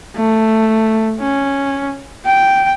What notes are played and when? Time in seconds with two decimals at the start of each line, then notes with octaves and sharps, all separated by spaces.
0.16 A3
1.20 C#4
2.26 G5